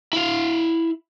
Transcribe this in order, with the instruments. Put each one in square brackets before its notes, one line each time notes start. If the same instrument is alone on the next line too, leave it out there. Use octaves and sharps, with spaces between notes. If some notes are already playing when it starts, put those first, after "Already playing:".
[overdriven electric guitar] E4 F5